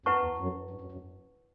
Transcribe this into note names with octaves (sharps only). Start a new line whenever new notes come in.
F#2 E4 B4 F#5 A5 C#6
E2
F#2
G2
F#2
F#2